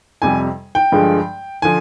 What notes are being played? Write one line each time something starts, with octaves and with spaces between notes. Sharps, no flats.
F2 C3 G3 G#5
G5
G2 D3 F3 G#3
D3 F3 G#5